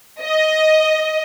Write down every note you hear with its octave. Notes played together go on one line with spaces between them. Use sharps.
D#5